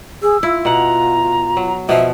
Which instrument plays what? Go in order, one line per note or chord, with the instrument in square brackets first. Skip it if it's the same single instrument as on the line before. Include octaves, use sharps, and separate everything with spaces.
[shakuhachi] G#4 [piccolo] E6
[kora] E4 [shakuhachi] F4
[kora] B2 F#5 [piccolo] A#5
[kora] F#3
[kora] B2 F3 [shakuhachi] E5